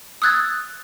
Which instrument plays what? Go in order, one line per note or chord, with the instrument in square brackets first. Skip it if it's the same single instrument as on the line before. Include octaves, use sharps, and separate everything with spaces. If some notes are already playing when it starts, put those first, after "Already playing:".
[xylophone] D#6 E6 F#6 G#6 A6